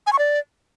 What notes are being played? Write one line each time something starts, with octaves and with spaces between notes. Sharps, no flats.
G#5
C#6
D5